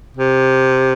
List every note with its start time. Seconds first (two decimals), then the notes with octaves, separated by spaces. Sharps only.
0.17 C3